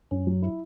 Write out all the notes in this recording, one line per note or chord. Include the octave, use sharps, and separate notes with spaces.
F#2 C#4
F#3
E4